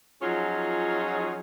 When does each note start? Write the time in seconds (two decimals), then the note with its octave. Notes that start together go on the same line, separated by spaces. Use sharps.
0.22 F3 F#3 C#4 D#4 F4 G#4